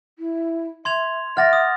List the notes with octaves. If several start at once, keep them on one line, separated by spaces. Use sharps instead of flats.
E4
E5 C6 G#6 F7
E5 F#5 D6 F6 A6 A#6
D#6